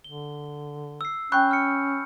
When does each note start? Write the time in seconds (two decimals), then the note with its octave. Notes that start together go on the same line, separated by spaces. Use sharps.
0.04 D3 G7
1.01 E6 C7
1.32 C#4 G5 B5 C#6 F#6 G6
1.51 F6 C#7